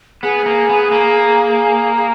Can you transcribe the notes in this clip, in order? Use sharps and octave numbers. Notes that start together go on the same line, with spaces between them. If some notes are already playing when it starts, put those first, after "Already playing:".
B3 G#4
A#3
B3
A#3
G#4